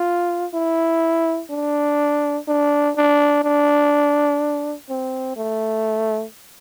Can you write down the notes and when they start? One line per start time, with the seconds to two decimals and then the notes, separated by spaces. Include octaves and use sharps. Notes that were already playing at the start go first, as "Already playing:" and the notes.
Already playing: F4
0.54 E4
1.51 D4
2.48 D4
2.96 D4
3.44 D4
4.90 C4
5.37 A3